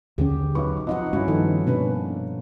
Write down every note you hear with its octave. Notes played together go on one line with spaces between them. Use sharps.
D#2 D3 C#4 G4 G#4
B1 F#3 B4 C#6
B1 F3 C4 D#4 D#5 F#5
G2 C#4 E4 F#4
D#3 F3 B3 D#4 A4
B2 A#3 C#4 D4 B4